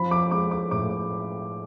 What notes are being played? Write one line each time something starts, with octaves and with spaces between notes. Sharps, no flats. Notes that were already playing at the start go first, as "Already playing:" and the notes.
Already playing: F3 B5
D6
G#3 D6
D6
A2 D6